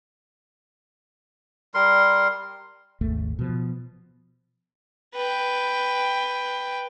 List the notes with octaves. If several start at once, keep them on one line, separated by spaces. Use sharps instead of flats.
G3 A#4 C6
G#1 D#2 C#3 A3
B2 F3
B4 G5